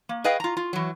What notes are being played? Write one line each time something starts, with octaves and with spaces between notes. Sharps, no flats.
A#3
G#4 B4 D#5 F5 G5
F4 A#5
F4
E3 F#3